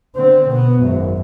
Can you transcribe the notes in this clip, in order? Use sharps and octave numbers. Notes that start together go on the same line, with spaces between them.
D3 C4
B2 B3
G#1 F#2